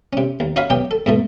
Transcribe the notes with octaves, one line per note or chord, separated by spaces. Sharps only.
C3 C#4
D#2
D#4 F#4 C#5 E5 F5 B5
B2 F#3 G4 G5
A4
G#2 B2 A3